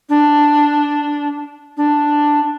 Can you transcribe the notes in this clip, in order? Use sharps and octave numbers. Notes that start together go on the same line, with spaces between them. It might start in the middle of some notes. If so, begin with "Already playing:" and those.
D4
D4